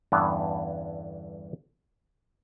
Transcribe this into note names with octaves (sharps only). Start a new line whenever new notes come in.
E2 G2 D3 E3 B3 C#4